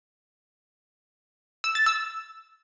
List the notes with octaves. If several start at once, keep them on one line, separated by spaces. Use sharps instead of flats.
E6
A6
E6